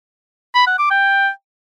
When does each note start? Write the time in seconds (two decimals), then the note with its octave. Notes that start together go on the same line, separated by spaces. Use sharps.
0.55 B5
0.67 F#5
0.79 D6
0.90 G5